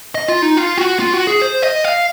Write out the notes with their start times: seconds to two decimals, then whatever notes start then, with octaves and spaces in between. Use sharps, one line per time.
0.15 D#5
0.28 F4
0.42 D#4
0.57 F4
0.78 F#4
1.00 F4
1.13 F#4
1.27 G#4
1.41 C5
1.62 D#5
1.84 F5